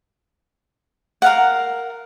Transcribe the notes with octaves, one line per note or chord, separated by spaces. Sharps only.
A#4 F5 F#5